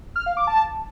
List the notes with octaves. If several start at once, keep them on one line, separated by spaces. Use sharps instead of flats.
F6
F5
D6
A5